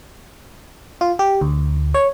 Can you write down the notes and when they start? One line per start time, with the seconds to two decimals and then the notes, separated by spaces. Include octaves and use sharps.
1.01 F4
1.19 G4
1.41 D2
1.94 C#5